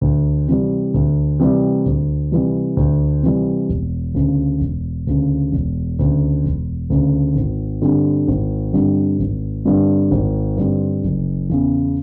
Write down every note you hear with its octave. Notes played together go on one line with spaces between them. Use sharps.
D2
C3 E3 G3
D2
C3 E3 G3
D2
C3 E3 G3
D2
C3 E3 G3
E1
D2 C#3
E1
D2 C#3
E1
D2 C#3
E1
D2 C#3
G#1
G2 D3 G3 C4
G#1
G2 D3 G3 C4
G#1
G2 D3 G3 C4
G#1
G2 D3 G3 C4
F#1
E2 C#3